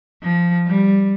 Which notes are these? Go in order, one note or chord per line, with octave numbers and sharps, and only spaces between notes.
F3
G3